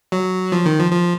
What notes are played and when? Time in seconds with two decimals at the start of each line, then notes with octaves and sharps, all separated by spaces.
0.12 F#3
0.52 F3
0.66 D#3
0.79 F3
0.92 F3